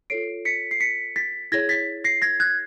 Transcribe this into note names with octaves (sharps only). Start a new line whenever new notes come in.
F4 A4 C#5 C7 D7
B6 C#7
C7
B6 C#7
A6 B6
E4 G#4 C#5 G#6 A#6
A6 B6
A#6 C7
G#6 A#6
F#6 G#6